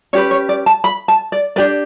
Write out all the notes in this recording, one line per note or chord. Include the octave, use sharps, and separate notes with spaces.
C#4 G4 B4 C#5
C#5
D5
A5
B5
A5
D5
D4 G4 B4 D5